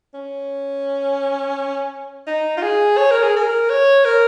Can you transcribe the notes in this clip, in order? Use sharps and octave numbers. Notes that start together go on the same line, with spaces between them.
C#4
D#4
F4
G#4
C#5
A#4
G#4
A#4
C#5
A#4